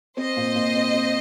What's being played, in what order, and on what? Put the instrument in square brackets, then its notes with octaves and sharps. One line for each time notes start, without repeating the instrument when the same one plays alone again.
[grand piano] C4 [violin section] C5 D#5
[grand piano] A#2
A#2
C4
C4